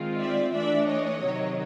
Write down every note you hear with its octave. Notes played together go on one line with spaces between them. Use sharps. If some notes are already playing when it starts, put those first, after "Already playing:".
Already playing: D#3 G#3 C4 F4
D5 E5
E3 A3 D4 D5 E5
C#5 D#5
C3 D#3 F#3